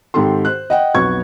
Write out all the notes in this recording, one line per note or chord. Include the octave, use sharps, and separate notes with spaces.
G#2 D#3 C4 G4 A4 C6
C5 F#6
D#5 F#5 G5
B1 F2 F#3 B3 C#6 G#6